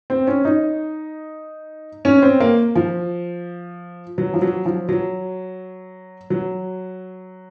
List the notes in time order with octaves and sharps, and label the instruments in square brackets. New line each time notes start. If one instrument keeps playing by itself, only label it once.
[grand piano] C4
C#4
D#4
C#4
C4
A#3
F3
F#3
F3
F#3
F3
F#3
F#3